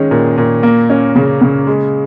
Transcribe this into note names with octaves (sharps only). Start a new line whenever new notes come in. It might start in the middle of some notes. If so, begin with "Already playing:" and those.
Already playing: D#3 G#3 C#4
A#2
A#2
A#3
C#4
C#3
C#3
G#3